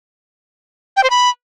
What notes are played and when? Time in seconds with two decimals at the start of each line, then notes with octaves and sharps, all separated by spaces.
0.97 G5
1.03 C5
1.10 B5